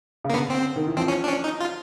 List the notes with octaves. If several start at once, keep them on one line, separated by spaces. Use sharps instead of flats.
C#3
A#3
D3 B3
C4
D#3
E3
F3 C4
C#4
D4
C#4
D#4
F4